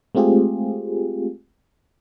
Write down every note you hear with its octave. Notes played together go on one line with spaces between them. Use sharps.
G#3 A3 C4 F4 G4 G#4